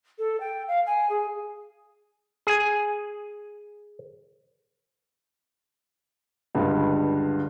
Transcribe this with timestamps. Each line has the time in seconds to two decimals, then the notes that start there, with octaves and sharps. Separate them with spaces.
0.18 A4
0.40 G5
0.68 F5
0.86 G#5
1.09 G#4
2.47 G#4 G#5
6.55 C#2 G2 D3